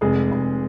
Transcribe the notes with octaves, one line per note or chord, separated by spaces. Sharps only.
F1 G#3 G#4
F1